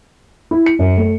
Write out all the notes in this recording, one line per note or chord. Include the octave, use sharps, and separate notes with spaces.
E4
C#7
F#2
A3